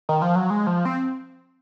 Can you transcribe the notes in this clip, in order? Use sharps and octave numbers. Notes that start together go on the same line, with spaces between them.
D#3
F3
F#3
G#3
F3
C4